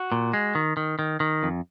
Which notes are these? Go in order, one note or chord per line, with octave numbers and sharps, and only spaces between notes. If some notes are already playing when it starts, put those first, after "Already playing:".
Already playing: F#4
A#2
G#3
D#3
D#3
D#3
D#3
F2